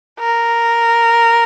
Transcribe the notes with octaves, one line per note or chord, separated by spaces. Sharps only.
A#4